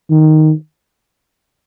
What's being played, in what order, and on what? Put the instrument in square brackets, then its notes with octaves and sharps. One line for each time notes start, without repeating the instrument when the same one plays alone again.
[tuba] D#3